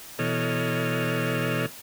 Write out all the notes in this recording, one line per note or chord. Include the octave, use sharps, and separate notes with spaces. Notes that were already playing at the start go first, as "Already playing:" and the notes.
B2 E3 A4 C#5 D#5 F6